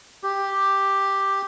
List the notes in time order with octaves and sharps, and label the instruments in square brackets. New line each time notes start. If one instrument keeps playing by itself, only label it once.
[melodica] G4